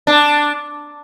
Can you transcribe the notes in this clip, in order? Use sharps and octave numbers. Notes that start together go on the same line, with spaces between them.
D4